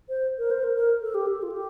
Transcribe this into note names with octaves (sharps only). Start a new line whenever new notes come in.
C5
A#4
C5
A#4
A#4
A4
G4
A4
F4
G4